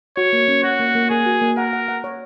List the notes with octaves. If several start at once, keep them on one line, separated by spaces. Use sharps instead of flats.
F#4 C#5
A#3
C#4
F#4 C#5
A#3
A#3
A#3 G#4
F#4
A#3
A#4 F#5
F#5
F#5
C#5